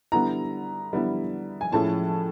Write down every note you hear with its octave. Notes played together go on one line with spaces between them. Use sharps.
D3 G3 B3 E4 A#5
D3 G3 B3 E4
G#5
A2 F3 G#3 C#4 E4 A5